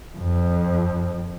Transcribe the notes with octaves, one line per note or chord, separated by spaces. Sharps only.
F2